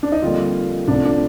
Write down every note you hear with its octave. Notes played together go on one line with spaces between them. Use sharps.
D4
D#4
F2 D3 G3 A#3 F4
C2 C3 F3 A3 D4
D4